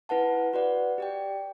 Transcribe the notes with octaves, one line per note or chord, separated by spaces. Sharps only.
E4 B4 F#5 A5
F#4 B4 D5 F#5
G4 D5 G5